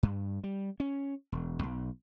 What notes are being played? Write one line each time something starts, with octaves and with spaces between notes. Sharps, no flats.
G2
G3
C#4
E1
B1